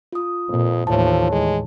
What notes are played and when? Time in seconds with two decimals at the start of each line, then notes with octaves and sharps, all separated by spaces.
0.12 F4 D#6
0.49 F2 A#2
0.87 D#2 A2 E3 F3 C#5 A5
1.32 G#3